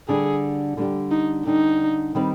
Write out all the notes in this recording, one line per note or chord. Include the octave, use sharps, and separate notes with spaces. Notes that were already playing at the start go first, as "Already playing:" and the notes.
D3 G3 D4 G4 G#4
D3 G3 D4 G4
D#4
D3 G3 D4 D#4 G4
D#3 G3 C4 D#4 B4